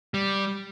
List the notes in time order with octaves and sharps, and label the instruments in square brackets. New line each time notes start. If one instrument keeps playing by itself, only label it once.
[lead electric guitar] G3